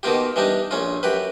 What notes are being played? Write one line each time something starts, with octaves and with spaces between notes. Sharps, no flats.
B2 D#3 A#3 F4 G4
E3 G3 D4 D#4
A#1 C#4 F4
F#2 G4 B4